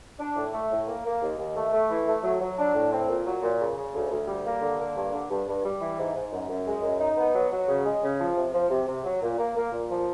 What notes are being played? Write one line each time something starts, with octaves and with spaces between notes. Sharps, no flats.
D4
A2
A3
A2
A#3
A#3
D#2
D#2
A3
A3
E3
A3
F#3
F#3
D4
A2
C4
A#2
F#3
A#2
C#3
C#3
D2
D2
G3
A#3
D3
A#3
G2
D3
G2
G2
G3
E3
G#2
G#2
F#2
F#2
G#3
F#2
D#4
B3
F#3
F#3
C#3
G#3
C#3
F3
C3
F3
C3
C3
F#3
A#2
A#3
A#3
A#2
F3